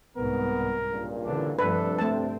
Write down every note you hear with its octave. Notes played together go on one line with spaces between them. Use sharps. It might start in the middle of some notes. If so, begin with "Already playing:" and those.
C2 G#2 B3 A#4
C#2 G2 A#2
D3 E3 D4
G2 C3 F3 A3 D4 A4 B4
A3 C4 A5